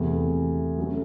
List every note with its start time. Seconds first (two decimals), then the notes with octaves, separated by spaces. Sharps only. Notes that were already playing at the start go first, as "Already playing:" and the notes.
Already playing: E2 C3 E3 A3
0.77 F#3 A3 C#4